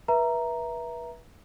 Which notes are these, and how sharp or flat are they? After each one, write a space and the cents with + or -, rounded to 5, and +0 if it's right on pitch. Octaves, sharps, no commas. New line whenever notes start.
B4 -35 E5 +0 A#5 +0